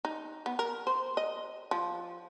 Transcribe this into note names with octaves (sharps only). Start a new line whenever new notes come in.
D#4
B3
A#4
C5
D#5
F3